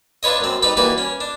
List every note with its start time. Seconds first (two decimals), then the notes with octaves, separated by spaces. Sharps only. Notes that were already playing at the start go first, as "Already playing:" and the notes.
0.23 D4 F4 B4 C#5 D#5
0.40 F#2 C4
0.63 G3 D#4 B4 B5
0.77 E3 G3 A#3 F#4 B4
0.98 C#4
1.20 D4